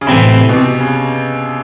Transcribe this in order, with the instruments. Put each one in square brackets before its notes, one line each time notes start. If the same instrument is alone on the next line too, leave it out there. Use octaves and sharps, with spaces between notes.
[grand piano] C#3
[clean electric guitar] A2 E3 A3 C4 E4 [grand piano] C3
[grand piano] B2
C3
C#3